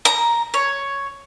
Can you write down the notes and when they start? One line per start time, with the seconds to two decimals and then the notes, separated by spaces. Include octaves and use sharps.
0.05 A#5
0.54 C#5